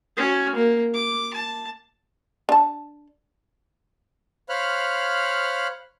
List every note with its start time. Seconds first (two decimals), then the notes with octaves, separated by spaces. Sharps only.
0.17 C#4 F#4
0.55 A#3
0.94 D6
1.34 A5
2.49 D4 A5
4.49 C5 C#5 F5 B5 F6 F#6